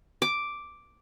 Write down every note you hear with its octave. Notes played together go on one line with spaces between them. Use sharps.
D6